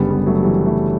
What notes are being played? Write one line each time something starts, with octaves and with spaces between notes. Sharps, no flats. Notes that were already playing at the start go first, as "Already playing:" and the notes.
Already playing: F#1 F#2 D3 G3 B3
G3 B3
F#3 A3
E3 G3
F#3 A3